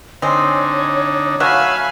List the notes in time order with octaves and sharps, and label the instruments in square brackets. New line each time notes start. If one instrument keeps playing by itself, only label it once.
[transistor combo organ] D3 D#4 [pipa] G#3 C4 [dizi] C#5
[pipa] F#3 A3 F#4 [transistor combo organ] E5 [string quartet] F5 G#5 B5